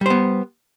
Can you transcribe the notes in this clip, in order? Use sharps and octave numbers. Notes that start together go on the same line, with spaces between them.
G3 B3 C5